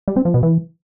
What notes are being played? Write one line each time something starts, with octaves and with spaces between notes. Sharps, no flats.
G3
C4
F3
B2
E3